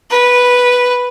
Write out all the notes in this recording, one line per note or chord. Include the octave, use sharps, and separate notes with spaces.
B4